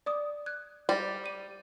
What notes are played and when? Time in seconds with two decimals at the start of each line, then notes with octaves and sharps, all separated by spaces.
0.06 D5 D6 D#6
0.46 F#6 G#6
0.89 G3 C5 A#6
1.24 D6 D#7